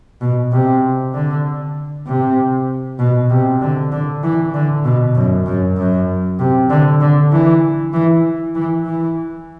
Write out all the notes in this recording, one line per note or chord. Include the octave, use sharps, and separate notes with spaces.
B2
C3
D3
C3
B2
C3
D3
D3
E3
D3
B2
F#2
F#2
F#2
C3
D3
D3
E3
E3
E3
E3